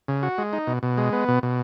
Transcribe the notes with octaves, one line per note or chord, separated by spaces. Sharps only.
C#3
F#4
G#3
D#4
B2
B2
G#3
B3
B2
B2